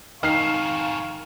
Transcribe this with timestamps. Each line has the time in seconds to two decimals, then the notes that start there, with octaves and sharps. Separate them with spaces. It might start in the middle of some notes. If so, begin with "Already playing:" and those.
0.23 F2 G#2 D#3 F5 C#6 F6 C7